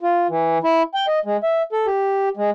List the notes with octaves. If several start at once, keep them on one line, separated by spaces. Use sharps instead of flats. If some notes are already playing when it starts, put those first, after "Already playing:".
F4
E3
E4
G5
D#5
G#3
E5
A4
G4
G#3